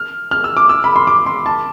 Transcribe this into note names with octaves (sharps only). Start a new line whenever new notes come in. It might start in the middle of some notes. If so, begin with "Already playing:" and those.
Already playing: F6
F6
E6
D6
E6
B5
C6
D6
C6
A5